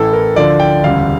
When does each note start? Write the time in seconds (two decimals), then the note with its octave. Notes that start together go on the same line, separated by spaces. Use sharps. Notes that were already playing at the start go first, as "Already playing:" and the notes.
Already playing: A1 A2 E3 A4
0.13 A#4
0.36 D2 D3 F3 D5
0.60 G5
0.83 E1 D2 C#3 G3 F5